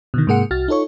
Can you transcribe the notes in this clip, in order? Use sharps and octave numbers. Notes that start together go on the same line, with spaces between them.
B2 D3 D#3
G#2 C3 A#3 G#4 F#5 C#7
C2 F#4 F6 A6
D#4 F4 A4 C#5 C#6